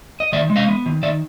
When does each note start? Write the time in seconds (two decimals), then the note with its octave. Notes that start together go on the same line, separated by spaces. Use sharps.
0.20 D#5
0.32 D#3 D5 E5
0.50 G#3
0.56 D#5 F5
0.68 B3
0.86 D#3
1.03 D#3 D5 E5